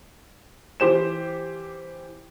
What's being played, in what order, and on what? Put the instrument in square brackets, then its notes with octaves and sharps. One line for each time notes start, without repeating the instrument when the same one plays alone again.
[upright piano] E3 G4 C5 E7